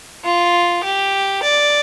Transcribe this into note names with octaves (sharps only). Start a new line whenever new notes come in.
F4
G4
D5